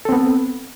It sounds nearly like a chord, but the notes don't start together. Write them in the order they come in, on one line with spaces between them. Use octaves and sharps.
A4 C4 B3